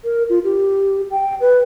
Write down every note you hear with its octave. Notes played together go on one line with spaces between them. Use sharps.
A#4
F4
G4
G5
B4